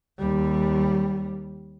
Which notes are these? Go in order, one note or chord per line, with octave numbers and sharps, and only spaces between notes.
D#2 G3